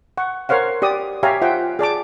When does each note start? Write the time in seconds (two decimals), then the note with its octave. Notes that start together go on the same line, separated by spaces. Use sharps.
0.18 F#5 C#6
0.49 A#4 C5 C#5 F5 F#5
0.82 G4 D5 D#6
1.23 G4 C#5 E5 F5 G#5 A#5
1.42 F4 C5 E5 F#5 G5
1.79 G#4 D5 A5 D6